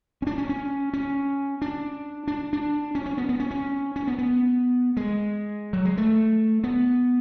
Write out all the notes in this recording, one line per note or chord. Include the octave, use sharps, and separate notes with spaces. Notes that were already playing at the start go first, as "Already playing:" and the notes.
C#4
D4
C#4
C#4
C#4
D4
D4
D4
C#4
C#4
B3
B3
C#4
C#4
C#4
B3
B3
G#3
F#3
G#3
A3
B3